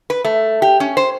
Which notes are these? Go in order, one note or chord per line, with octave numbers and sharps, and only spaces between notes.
B4
A3
G4
C#4
C5